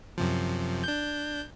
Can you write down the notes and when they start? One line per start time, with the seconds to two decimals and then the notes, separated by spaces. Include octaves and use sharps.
0.18 F#2 C3 F3
0.84 D4 G6